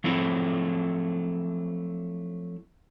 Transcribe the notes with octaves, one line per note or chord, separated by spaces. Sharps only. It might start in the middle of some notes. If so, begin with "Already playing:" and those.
F3 F#3 A3 C4 E4